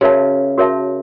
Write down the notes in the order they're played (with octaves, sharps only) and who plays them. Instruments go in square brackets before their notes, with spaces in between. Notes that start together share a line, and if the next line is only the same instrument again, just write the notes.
[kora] C#3 [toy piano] F#4 A#4 C#5 E5 A5
[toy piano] F#4 A#4 C#5 E5 A5